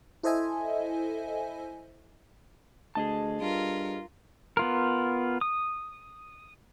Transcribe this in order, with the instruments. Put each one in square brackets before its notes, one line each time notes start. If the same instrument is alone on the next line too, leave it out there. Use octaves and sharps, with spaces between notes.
[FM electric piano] E4 A4 C5 D#5 E5 G#5
[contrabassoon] D2 [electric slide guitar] G#4 D#5 A5
[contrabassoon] G2 [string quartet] F4 A#4
[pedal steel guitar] B3 F4 A#4
D#6